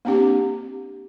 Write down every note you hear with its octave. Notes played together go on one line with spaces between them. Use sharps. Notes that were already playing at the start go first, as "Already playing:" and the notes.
A#3 C4 D4 G4